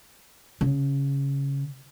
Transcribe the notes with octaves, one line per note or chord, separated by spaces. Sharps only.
C#3